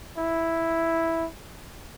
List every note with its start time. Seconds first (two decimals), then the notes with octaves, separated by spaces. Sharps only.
0.18 E4